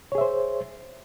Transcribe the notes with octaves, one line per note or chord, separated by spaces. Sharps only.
G#4 C5 C#5 E5